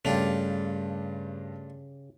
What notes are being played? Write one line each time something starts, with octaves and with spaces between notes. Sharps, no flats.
G2 C#3 A3 D4 F4 G4 F7